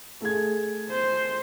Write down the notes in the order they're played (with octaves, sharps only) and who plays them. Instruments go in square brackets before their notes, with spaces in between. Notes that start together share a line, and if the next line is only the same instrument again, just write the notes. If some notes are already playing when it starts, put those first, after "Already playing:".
[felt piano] A3 G#4 G#6
[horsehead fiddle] C5